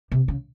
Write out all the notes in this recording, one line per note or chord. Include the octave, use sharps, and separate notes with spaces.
C3
C#3